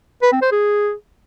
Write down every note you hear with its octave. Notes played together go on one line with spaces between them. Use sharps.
B4
C4
C5
G#4